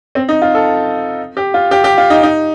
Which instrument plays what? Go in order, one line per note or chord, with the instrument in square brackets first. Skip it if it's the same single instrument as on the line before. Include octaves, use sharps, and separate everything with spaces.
[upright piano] C4
D#4
F4
A4
G4
F4
G4
G4
F4
D#4
D#4